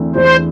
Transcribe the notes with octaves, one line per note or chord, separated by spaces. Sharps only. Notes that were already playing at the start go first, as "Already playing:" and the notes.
Already playing: E2 D3 A3 C4 E4
E2 C5